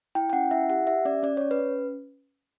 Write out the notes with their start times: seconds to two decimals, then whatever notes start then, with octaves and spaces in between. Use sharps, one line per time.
0.15 E4 G5
0.30 G5
0.33 C#4 F#5
0.51 E4 E5
0.70 G4 F#5
0.87 G4 E5
1.05 C#4 D5
1.23 C#4 D5
1.37 C#4 C#5
1.51 B4
1.59 C#4